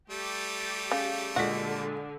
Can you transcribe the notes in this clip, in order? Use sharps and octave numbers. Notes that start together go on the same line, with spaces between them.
G3 A3 G4
C#3
A#2 D3 G#3 F#4 B6